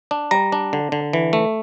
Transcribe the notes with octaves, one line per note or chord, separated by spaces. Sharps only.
D4
G3 A#5
D4
D3
D3
E3
A3